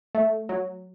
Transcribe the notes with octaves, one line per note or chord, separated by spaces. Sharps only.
A3
F#3